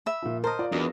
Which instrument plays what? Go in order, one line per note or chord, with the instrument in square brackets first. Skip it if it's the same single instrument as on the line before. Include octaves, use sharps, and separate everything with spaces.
[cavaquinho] E5 B5
[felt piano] A#2 F3
[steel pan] A#4 [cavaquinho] C5 D#5 [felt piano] A5
[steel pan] F4 [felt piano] D5
[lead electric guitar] E2 [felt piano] D4 F#4 A#4 [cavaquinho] D#5